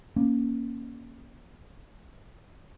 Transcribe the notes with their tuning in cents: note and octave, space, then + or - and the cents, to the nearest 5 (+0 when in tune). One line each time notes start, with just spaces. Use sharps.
A#3 +15 C#4 +0